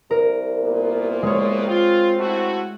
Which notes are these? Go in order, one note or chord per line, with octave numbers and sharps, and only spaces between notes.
C2 A#4
A#2 A#3 B3
G#3 C#5
C4 F4
A3 E4 F#4